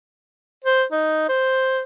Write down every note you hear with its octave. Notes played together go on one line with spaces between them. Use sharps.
C5
D#4
C5